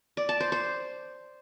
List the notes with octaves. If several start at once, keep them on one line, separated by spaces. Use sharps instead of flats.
D5
A5
C5
C5